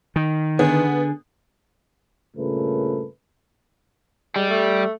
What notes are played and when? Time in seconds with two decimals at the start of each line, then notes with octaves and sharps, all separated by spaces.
0.16 D#3
0.59 D3 B3 G#4
2.36 G2 A#2 C#3 A3 A#4 B4
4.36 G3 G#3
4.49 A3